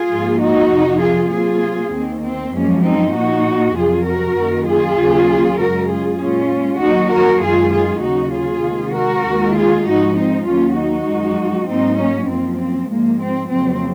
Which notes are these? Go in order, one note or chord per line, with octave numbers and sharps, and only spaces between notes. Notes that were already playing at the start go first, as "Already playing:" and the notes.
Already playing: F4 G#4
G#2 F3 A#3
D#4 F#4
F2 C3 F3
F4 G#4
C3 F#3 A#3 F4 G#4
D#2 D#3 A#3 C4
C4
F#2 F3 G#3 A#3 C#4
C4 D#4
A#2 F3 A#3 D#4 F#4
F2 C3 F#3 F4 G#4
F#4 A#4
F#2 D#3 A#3
F4 G#4
D#2 C#3 F#3 A#3
F#2 C#3 G#3 F#4 A#4
F4 G#4
A#2 G#3 C#4 F4
D#2 D#3 F#3 A#3 D#4 F#4
F#4 A#4
F#2 D#3 G#3 F4 G#4
F4 G#4
D#2 C#3 F#3 D#4 F#4
F4 G#4
C3 D#3 G#3
F#4 A#4
D#2 D#3 G#3
F4 G#4
G#2 F3 G#3 D#4 F#4
C4 D#4
D#2 D#3 F#3 A#3 C#4 F4
D#4 F#4
F#2 F3 G#3
G#2 F#3 A#3 C4 D#4
A#3 C#4
F#2 F3 A#3 C4
C4
G#2 F3 G#3 A#3
C4
F2 C#3 F#3 A#3 C4